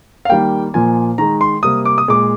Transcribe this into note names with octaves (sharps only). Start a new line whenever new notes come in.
F5
D#3 G3 A#3 G5
A#2 F3 A#3 G#5
D#3 G#3 A#5
C6
C3 G3 A#3 D#6
D6
D#6
A#2 G#3 D6